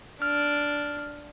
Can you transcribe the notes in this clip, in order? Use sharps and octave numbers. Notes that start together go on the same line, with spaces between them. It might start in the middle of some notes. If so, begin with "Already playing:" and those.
D4 F6